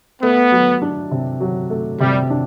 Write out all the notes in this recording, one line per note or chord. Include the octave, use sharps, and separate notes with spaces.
A3 B3
F#3
D4
C3
F#3
A3
C3 G3
D4